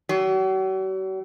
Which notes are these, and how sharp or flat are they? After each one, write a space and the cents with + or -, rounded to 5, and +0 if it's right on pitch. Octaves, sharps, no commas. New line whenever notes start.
F#3 +45